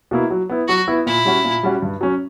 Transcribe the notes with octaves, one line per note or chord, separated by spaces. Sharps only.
B2 A#3 E4
F#3
B3 E4
F#3 F#4
B3 E4
A#2 E4
G3 C#4 F#4
A#2
G3 C#4 F#4
G2
F#3 C#4